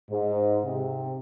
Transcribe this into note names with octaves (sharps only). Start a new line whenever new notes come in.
G#2
C3